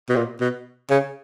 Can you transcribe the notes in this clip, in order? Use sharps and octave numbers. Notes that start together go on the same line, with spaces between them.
B2
A#2
B2
C#3